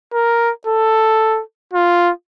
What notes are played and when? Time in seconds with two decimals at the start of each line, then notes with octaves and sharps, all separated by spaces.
0.14 A#4
0.67 A4
1.73 F4